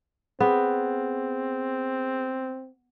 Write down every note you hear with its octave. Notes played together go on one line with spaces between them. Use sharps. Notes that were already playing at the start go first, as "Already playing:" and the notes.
B3 C4 G#4